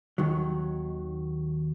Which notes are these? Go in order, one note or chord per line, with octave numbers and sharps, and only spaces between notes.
D#2 D#3 F#3